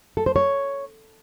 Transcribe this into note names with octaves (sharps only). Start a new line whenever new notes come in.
A4
C5
C#5